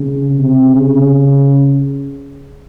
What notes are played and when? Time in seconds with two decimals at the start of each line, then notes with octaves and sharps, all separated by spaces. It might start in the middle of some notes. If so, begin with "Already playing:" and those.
Already playing: C#3
0.39 C3
0.73 C#3